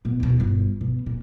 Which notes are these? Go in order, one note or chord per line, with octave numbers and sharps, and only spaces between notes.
A#2 B3
D#2 B2
G1
B2
A#2